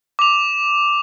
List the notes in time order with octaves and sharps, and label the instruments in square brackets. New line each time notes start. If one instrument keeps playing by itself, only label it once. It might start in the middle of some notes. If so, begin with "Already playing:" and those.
[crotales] D6 F7